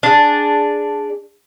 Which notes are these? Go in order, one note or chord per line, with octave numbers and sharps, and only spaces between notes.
D4 G#4